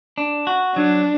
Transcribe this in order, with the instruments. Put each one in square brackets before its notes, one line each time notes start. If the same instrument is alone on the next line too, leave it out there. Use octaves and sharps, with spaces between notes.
[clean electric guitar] D4
F#4
[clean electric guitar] F#3 [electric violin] D4